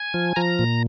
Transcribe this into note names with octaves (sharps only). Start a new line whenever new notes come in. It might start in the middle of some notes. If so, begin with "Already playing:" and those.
Already playing: G#5
F3
F3 A#5
A#2